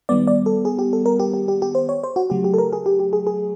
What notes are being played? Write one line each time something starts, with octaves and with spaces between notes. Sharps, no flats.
D#3 G3 B3 D5
D5
A4
G#4
G4
A4
A#4
G4
G4
G4
G4
C5
C#5
C5
F#4
C#3 F#3 A3 G4
G4
A4
A#4
G#4
G4
G4
G#4
G#4